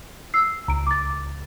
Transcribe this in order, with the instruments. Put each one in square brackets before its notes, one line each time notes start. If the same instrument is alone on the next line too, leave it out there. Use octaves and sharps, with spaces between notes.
[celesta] E6 C7
[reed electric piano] C#2 [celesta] A#5 D7
[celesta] D6 A6